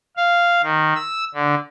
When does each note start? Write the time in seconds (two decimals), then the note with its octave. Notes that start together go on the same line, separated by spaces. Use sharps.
0.17 F5
0.63 D#3
0.95 E6
1.34 D3